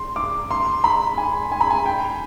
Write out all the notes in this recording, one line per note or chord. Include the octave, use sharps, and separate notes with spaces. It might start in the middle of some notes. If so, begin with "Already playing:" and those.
Already playing: C6
D6
C6
B5
G#5
G#5
B5
G#5
G5